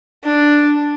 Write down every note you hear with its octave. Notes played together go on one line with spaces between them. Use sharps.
D4